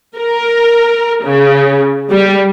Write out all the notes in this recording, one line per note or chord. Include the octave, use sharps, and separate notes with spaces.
A#4
C#3
G3